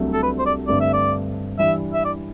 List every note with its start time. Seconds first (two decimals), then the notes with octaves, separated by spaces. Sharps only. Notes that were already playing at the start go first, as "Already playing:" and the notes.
Already playing: C2 C3 F#3 A3 D4
0.13 A4
0.23 B4
0.38 C5
0.46 D5
0.67 G2 D3 A3 C4 D5
0.81 E5
0.93 D5
1.59 E3 G3 D4 E5
1.94 E5
2.05 D5